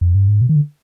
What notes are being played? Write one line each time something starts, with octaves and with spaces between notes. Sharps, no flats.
F2
G2
G#2
B2
D#3
D3